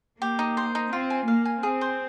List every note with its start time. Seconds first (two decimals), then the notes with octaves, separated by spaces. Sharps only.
0.21 A#3 G4
0.39 D#4
0.57 C5
0.75 D#4
0.92 C4 F4
1.10 G#5
1.28 A#3 F5
1.45 G#5
1.63 C4 G#4
1.81 C5